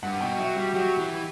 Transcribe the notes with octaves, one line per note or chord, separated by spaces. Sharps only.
G2 F#5
B2 G5
F#3 E5
G3 F#4
F#3 G4
E3